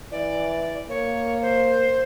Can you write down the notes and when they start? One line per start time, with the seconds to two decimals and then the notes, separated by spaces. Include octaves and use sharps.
0.12 E3 D5
0.89 A#3 C#5
1.42 C5